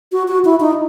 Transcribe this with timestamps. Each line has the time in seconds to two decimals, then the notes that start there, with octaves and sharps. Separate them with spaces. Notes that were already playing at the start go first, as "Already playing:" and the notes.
0.12 F#4
0.28 F#4
0.45 E4
0.60 D#4